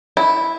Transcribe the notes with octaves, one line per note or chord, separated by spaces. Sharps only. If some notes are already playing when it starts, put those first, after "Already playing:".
E4